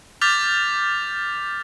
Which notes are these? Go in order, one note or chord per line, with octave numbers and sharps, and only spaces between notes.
D6 F6 G6 A6 B6 F7